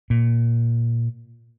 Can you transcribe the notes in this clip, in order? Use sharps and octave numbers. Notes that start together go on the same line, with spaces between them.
A#2